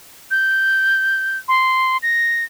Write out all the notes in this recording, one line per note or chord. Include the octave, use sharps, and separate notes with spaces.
G6
C6
A#6